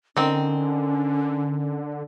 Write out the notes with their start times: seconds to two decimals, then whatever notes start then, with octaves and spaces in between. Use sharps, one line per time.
0.17 D3 D#3 C4 C#4